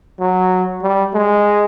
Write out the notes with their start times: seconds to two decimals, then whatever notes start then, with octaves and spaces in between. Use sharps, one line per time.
0.20 F#3
0.82 G3
1.14 G#3